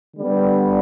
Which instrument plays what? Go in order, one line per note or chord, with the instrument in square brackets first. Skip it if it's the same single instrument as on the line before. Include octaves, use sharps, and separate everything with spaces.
[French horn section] D3 G3 B3